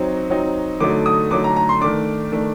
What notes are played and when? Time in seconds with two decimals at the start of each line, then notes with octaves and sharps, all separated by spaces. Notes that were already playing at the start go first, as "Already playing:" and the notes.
Already playing: F#3 C4 D#4
0.30 F#3 C4 D#4
0.80 D3 F#3 A3 D#4 D6
1.06 D#6
1.31 D3 F#3 A3 D#4 D6
1.44 A#5
1.56 A#5
1.69 C6
1.81 D#3 A3 D4 D6
2.32 D#3 A3 D4